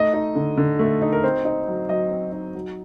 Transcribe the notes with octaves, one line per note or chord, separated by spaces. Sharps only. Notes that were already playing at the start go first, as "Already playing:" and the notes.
Already playing: A3 D#4 D#5
D#4
D3
D3
A3
D#4
A#4
C4 C5
D#4
F#3
F#3 D#5
C4
D#4
F#3